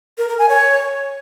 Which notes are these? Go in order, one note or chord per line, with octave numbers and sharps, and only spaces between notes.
A#4
A#4
G#5
C#5